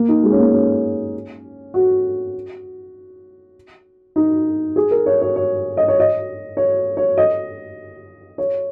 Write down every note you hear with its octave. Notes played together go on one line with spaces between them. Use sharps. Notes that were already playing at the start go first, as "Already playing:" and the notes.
Already playing: A#3
D#4
G#3
C#4
A#3
C#4
F#4
D#4
G#4
A#4
C#5
C#5
C#5
D#5
C#5
D#5
C#5
C#5
D#5
C#5